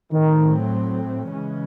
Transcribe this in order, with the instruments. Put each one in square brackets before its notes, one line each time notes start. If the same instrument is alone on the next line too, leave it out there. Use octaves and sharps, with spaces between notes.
[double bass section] A2 F#3 A3 C4 [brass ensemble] D#3
[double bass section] C#3 E3 G#3 C#4